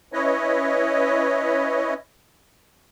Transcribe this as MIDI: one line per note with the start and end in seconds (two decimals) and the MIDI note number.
0.13 1.94 61
0.13 1.94 64
0.13 1.94 71
0.13 1.94 73
0.13 1.94 75